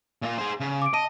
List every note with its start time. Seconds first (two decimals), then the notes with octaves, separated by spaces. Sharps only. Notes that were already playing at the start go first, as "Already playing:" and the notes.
0.22 A#2 F4
0.38 G#4 C5
0.60 C#3
0.82 D6 D7
0.94 D#5 A5 D#7